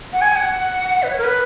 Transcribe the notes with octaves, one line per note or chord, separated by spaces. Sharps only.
F#5
G#5
F#5
B4
C#5
A#4
B4